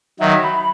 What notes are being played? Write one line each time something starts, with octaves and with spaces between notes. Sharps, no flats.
D#3 F#3 E5
B5